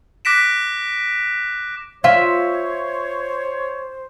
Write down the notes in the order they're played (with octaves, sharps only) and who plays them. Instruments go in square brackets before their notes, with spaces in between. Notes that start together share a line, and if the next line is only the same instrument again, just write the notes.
[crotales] D6 F#6 A#6 B6 D7 E7
[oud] F4 [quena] C5 [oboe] C#5 [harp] E5